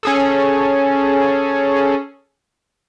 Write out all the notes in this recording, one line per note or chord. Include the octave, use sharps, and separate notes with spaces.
C#4 G#4 A4